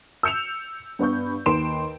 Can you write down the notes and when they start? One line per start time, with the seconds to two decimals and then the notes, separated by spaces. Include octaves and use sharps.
0.23 E6 G6 C#7 E7 F7
0.99 G2 B3 B4 C#6 G6
1.46 D#2 D#3 B4 C6 D7 E7